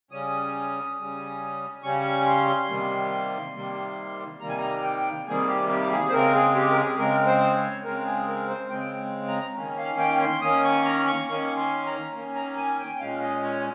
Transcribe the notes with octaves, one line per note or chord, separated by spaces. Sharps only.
C#3 G3 C#4 D#6
C#3 G3 C#4
C#3 G3 C#4 C#6
C6
C3 D#3 G3 A#3
C3 D#3 G3 A#3
C3 D#3 G3 A#3 A#5
G#5
A#5
G5
C3 D#3 G3 A#3 G#4
G4
G4
G#4
C5
C#3 G#3 C4 A#4
G#4
G4
A#4
G#4
C#3 G#3 C4 A#4
C5
C#5
C#3 G#3 C4 A#4
G#4
A#4
C5
C#3 G#3 C4 G5
A#5
D#3 A#3 C#4
F5
G5
C6
D#3 A#3 C#4 D#6
C#6
A#5
C#6
D#3 A#3 C#4 C#6
C6
A#5
D#3 A#3 C#4
A#5
G#5
G5
G5
A#2 G#3 C#4 F5
D#5
C#5